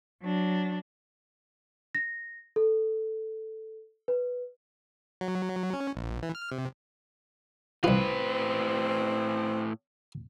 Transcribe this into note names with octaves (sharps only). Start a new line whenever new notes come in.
F#3 D4
A#6
A4
B4
F#3
C#4
A#1
E3
F6
C3
C2 A2 C4 F4 B4